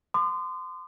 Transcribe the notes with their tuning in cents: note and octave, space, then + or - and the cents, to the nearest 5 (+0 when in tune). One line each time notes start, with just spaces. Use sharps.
C6 -25 D#6 -45